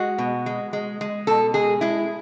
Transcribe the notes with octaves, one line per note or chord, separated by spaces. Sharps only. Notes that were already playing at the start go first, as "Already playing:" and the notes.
Already playing: G#3 F#4
B2
G#3
G#3
G#3
B2 A4
G#3 G#4
G#3 E4